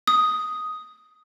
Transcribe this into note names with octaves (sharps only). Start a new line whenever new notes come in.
D#6